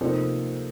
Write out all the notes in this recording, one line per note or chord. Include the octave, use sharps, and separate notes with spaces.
C3 F3 A#3 D#4 A4 C5